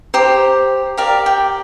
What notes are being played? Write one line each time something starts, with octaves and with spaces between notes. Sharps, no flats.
G4 C5 A#5
G4 A#4 D5 F5
G5